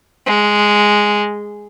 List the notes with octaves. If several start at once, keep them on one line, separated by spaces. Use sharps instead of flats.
G#3